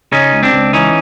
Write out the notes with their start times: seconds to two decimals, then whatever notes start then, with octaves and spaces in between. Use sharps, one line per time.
0.12 C#3 C#4 D#4
0.32 C#2
0.43 C4 D4
0.53 C#2
0.73 E3 C#4 D#4